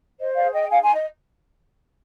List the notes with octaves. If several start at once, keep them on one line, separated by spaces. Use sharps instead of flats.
C5 D#5
D5 F5
G#4
D#5 G5
G5
D#4 F5 G#5
G#5 C6
D#5